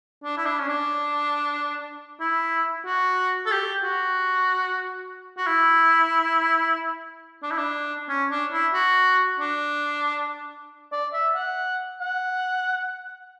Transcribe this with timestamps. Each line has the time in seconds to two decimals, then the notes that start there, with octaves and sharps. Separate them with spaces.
0.24 D4
0.37 E4
0.46 D4
0.59 C#4
0.69 D4
2.20 E4
2.86 F#4
3.46 A4
3.52 G4
3.83 F#4
5.38 F#4
5.47 E4
7.43 D4
7.51 E4
7.58 D4
8.09 C#4
8.31 D4
8.52 E4
8.74 F#4
9.40 D4
10.92 D5
11.13 E5
11.35 F#5
12.01 F#5